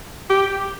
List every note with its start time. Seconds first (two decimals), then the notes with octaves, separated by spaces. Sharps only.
0.30 G4